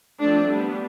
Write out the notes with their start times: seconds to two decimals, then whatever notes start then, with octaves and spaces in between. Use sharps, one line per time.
0.21 F3 A3 C4 D4
0.50 G3 B3 D4